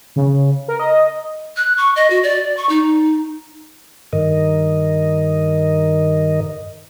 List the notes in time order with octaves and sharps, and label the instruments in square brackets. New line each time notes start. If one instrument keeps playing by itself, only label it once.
[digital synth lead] C#3
A#4
D#5
[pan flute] F#6
C#6
D#5
F#4
D5
C#6
D#4
[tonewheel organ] G2 D#3 A#4 D#5